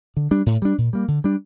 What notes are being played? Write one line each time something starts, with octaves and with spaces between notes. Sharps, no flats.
D3
G3 D4
A2
G3 D4
A#2
G3 A#3
D3
G3 D4